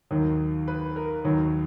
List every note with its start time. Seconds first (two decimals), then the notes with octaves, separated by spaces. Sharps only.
0.11 D#2 D#3 F#3
0.68 B4
0.96 A#4
1.25 D#2 D#3 F#3